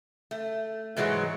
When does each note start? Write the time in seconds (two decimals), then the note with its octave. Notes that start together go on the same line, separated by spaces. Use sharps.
0.31 A3
0.96 G#2 E3 F#3 G#3 C#5